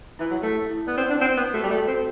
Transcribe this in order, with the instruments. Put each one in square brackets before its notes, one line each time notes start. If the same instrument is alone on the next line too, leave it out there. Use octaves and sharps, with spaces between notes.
[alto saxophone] E3 [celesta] E4
[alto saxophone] F#3
[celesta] E4
[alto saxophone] A3
[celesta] G4
E4
[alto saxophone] B3 [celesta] D5
[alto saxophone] C4
[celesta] F#5
[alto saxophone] D4
[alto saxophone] C4 [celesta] F#5
[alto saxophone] B3 [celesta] F#5
[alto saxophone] A3 [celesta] F#4
[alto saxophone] G3
[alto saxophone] A3 [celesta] A4
[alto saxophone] C4 [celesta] F#4